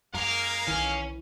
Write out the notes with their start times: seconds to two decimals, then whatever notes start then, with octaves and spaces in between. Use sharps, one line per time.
0.14 F#2 G#3 A#3 A#4 F5
0.67 B1 D#3 E3 C#4